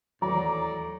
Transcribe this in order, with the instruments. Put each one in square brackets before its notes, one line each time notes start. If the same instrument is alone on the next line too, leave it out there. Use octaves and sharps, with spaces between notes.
[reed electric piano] D#2 E3 F#3 [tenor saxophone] A2 [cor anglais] D5 [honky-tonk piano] A#5